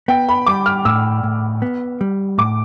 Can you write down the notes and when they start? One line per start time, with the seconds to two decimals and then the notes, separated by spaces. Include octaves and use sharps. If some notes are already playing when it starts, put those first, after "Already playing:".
0.08 B3 G5
0.29 B5
0.46 G3 D6
0.66 F6
0.85 A2 E6
1.23 A2
1.62 B3
2.01 G3
2.38 A2 D6